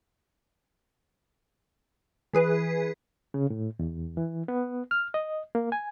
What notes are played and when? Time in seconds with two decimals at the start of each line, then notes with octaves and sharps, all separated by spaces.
2.33 E3 G#4 B4
3.34 C#3
3.50 A2
3.79 E2
4.17 E3
4.48 B3
4.91 F6
5.14 D#5
5.55 A#3
5.72 G#5